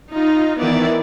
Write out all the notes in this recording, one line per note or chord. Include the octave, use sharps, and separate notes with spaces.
D#4 F4
D#3 E3 B3 E4 D5